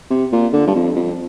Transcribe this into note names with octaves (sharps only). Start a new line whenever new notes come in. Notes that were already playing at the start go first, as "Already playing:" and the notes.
C3
A#2
D3
G2
F2
F2